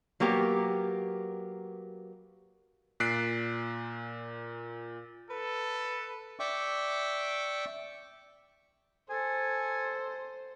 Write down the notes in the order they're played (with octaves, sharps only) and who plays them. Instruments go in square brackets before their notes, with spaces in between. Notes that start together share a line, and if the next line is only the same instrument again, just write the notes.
[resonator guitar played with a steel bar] F#3 A#3 B3 G4 A#4
[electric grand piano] A#2 F#6 B6 C7 D7
[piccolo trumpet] A4 [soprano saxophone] B4
[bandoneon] D5 E5 G5 C#6 D6
[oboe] A4 [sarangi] C5 [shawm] G#5